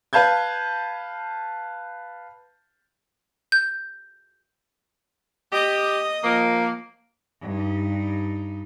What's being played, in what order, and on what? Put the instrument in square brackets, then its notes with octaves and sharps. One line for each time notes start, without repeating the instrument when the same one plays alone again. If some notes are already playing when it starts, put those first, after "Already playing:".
[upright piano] B4 F5 A5 G6 G#6
[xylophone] G6
[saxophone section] G4 [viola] D#5
[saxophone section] F3 A#3
[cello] G2 D#4